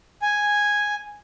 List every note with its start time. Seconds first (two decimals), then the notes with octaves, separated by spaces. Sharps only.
0.22 G#5